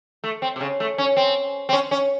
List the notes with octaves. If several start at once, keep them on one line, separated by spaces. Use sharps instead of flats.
A3
C4
C3
C#3
A3
C#4
C4
C4
C#4
C#4